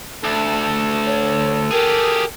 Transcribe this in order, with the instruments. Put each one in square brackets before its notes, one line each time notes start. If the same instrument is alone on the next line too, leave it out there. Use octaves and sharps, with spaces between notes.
[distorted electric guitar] D2 [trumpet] A4
[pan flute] C#5
[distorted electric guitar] G4 G#4 [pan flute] A#4